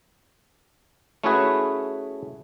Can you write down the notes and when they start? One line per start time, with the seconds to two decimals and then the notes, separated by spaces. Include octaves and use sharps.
1.24 A3 C#4 E4 F#4 G#4 B4